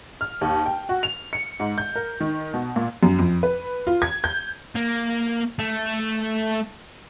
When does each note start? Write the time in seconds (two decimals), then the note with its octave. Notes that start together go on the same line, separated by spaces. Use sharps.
0.21 F6
0.41 D#2
0.66 G5
0.89 F#4
1.03 F7
1.33 C#7
1.60 G#2
1.78 G6
1.96 A#4
2.20 D#3
2.53 B2
2.76 A#2
3.03 F#2
3.19 F2
3.43 B4
3.87 F4
4.02 G#6
4.24 G6
4.75 A#3
5.59 A3